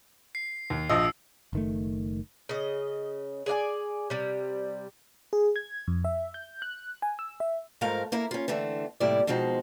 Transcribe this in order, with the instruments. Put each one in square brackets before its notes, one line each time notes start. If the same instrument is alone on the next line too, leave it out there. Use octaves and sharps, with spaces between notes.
[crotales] C7
[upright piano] D#2
[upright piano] A#1 F3 D#5 [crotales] E6
[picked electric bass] F#1 D#3 A3
[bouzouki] C#3 D#5
G#4 D5 F5 G#5
C3 G3
[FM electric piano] G#4
G#6
F2
E5
G6
F#6
G#5
E6
E5
[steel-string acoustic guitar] G#2 F3 A3 A#4 F5
A#3 E4 A#4
C#4 F4
D3 E3 A3 C4
D#2 A2 C3 G3 E4 D5
B2 F3 G#3 C4 D#4